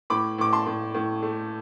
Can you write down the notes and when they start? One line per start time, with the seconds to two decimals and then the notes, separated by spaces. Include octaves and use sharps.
0.10 A2 B5 D6
0.38 A2 D6
0.53 A5 C6
0.66 A2
0.95 A2
1.22 A3